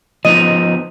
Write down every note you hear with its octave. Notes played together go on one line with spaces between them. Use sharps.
F3 B3 D#4 D#5 D#7